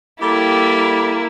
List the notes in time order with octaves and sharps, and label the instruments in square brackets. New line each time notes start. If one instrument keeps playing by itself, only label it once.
[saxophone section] G3 G4 A4 [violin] A#3 E4